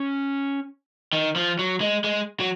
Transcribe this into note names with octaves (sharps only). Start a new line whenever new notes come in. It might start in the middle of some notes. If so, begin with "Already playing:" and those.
Already playing: C#4
D#3
F3
F#3
G#3
G#3
F#3